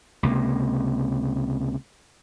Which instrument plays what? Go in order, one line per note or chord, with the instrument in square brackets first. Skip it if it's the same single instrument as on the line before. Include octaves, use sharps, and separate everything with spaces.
[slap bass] C#2 C3 A#3